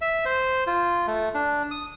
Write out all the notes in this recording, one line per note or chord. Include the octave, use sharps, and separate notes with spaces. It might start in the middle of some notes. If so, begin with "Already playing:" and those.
E5
C5
F4
A3
D4
D#6